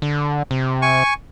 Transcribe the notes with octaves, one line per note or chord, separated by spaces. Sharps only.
D3
C3
G#5 C#6